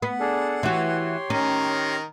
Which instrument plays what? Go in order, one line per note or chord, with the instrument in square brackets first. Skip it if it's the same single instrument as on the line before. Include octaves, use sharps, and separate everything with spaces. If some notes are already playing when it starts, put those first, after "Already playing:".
[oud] B3 [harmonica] F#5
[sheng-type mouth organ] D4 G#4 A4
[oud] E3 F#4 [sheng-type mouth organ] G4 C#5 C6
[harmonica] D#3 A#5 [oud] C#4